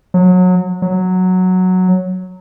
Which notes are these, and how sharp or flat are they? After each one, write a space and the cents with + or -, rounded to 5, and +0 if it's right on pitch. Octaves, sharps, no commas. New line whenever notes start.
F#3 -25
F#3 -5